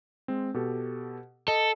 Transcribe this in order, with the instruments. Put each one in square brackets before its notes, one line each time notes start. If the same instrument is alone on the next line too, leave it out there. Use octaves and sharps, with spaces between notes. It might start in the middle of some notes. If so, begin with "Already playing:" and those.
[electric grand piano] G#3 C4
B2 G4 A4
[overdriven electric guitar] A4 [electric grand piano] D#5